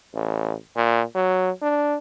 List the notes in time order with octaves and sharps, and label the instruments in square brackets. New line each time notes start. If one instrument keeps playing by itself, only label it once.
[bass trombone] A1
A#2
F#3
D4